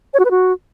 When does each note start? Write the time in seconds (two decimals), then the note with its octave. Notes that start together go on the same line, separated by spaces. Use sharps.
0.14 C#5
0.19 F#4
0.25 B4
0.31 F#4